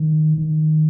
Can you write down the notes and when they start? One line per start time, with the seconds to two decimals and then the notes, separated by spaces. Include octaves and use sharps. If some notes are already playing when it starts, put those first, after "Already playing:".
Already playing: D#3
0.38 D#3